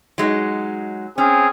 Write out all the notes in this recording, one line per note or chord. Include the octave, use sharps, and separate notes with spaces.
F#3 G#3 D#4
C4 C#4 G#4